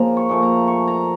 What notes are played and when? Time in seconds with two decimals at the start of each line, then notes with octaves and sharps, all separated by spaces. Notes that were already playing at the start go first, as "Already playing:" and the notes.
Already playing: C#3 F3 A#3 A#5
0.17 C#6
0.29 A#2 F3 A3 C#6
0.43 A#5
0.67 C#6
0.88 A#5